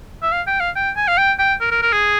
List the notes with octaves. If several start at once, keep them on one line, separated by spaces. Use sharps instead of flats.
E5
F5
G5
F5
G5
G#5
F5
G5
G5
A#4
A#4
A#4
G#4